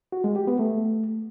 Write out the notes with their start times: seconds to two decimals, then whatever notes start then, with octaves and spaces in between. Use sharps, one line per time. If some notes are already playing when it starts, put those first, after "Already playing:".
0.12 F#4
0.24 G#3
0.36 G4
0.47 B3
0.59 A3